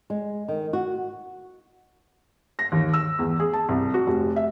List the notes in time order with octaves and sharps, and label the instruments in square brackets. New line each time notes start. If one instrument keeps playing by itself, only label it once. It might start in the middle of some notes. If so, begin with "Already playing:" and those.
[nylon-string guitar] G#3
D#3
F#4
[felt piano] A#6
D#2
E6
E2
G#4
A5
C2
F#4
F1
E5